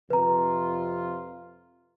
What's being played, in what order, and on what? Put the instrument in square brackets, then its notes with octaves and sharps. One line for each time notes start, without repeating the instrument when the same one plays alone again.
[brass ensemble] F2 C3 F4 [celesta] B4 A#5